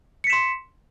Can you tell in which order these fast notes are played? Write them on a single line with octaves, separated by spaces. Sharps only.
C#7 B6 E7 C6